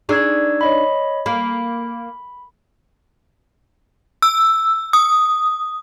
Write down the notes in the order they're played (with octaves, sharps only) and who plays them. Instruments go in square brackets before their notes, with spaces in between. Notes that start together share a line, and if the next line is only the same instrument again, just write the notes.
[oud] D4 D#4 G#4 [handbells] C#6 E6 G#6
[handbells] C#5 D#5 B5
[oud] A#3 [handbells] B5
[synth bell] E6
D#6